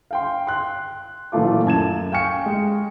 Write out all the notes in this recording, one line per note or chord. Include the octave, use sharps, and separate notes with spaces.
F5 G5 C6
C6 F#6
A#2 E3 F#3 A3 F4 D6
F#2 A5 G#6 E7
F5 G5 G#5 C#6 F6 C#7
G#3